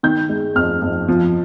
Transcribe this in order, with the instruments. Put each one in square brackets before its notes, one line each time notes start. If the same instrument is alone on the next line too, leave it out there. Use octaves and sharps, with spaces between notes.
[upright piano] D#3 G6
G#3
F2 F6
F2
F3